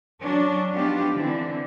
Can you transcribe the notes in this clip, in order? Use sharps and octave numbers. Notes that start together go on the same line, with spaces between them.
F#3 C#4 D4
F3 B3 D4 D#4 F4 G4
D3 E3 C4